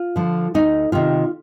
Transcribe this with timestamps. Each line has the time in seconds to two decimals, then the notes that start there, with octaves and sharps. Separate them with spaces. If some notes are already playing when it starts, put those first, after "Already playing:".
Already playing: F4
0.16 D3 F3
0.54 D2 D#4
0.92 C3 D#3 F4